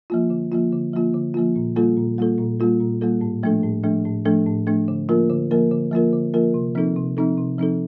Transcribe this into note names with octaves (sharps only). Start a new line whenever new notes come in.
F3 A#3 F4
D3
F3 A#3 F4
D3
F3 A#3 F4
D3
F3 A#3 F4
A#2
G3 A#3 F4 A4
A#2
G3 A#3 F4 A4
A#2
G3 A#3 F4 A4
A#2
G3 A#3 F4 A4
A2
F3 A3 D4 A4
A2
F3 A3 D4 A4
A2
F3 A3 D4 A4
A2
F3 A3 D4 A4
D3
F3 A#3 F4 A#4
D3
F3 A#3 F4 A#4
D3
F3 A#3 F4 A#4
D3
F3 A#3 F4 A#4
C3
F3 C4 D#4 A4
C3
F3 C4 D#4 A4
C3
F3 C4 D#4 A4